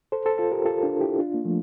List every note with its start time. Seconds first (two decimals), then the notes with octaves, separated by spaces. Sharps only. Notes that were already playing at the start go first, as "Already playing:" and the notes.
0.12 A4 C5
0.26 A4 C5
0.38 F4 A4
0.52 G4 A#4
0.65 F4 A4
0.83 D4 F4
1.01 E4 G4
1.19 D4 F4
1.34 A#3
1.45 F3 A3